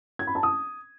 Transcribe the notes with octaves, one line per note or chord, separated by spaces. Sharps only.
G#6
B5
A5
D#6